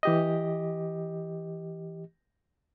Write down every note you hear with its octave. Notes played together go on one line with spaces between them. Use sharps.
E3 G4 D#5